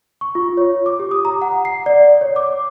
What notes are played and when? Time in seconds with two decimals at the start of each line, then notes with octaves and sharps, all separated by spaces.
0.21 C#6
0.35 F4
0.57 C#5
0.86 D6
1.00 G4
1.11 D#6
1.25 A#5
1.42 F#5
1.65 C7
1.86 D5
2.21 C#5
2.36 D6